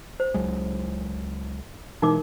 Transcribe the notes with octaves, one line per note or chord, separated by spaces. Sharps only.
C5
C#2 F#3 G#3
B2 E3 G#3 D#4 A#4 D6